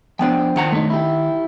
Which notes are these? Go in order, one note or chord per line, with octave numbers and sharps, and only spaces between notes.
F3 B3 D4 C5 G5
D#3 F#5 A#5
A3 C#4 D#4
E4 G4